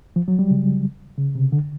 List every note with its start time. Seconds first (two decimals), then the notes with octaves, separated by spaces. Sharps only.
0.16 F3
0.28 F#3
0.39 G3
0.51 C#3
1.18 C#3
1.35 C3
1.52 D3